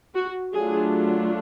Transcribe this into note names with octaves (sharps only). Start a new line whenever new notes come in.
F#4
F#3 A3 D4 F4 G#4